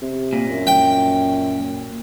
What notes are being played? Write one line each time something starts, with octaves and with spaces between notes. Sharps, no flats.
C3
A#2
F#2
G5